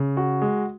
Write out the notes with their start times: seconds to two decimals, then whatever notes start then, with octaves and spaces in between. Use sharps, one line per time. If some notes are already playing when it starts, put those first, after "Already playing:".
Already playing: C#3
0.17 F#4
0.42 G#3